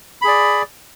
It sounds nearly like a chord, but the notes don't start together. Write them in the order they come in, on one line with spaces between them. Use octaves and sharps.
B5 G#4 D5